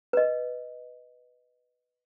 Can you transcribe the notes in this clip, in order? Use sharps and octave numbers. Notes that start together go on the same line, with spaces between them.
B4 D#5